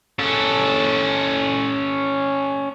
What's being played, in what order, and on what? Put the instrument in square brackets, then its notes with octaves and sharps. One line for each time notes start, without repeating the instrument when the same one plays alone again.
[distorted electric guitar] C#4 A4